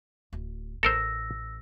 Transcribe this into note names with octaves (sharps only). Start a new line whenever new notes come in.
D1
A1 A4 A#4 C5 E6 A#6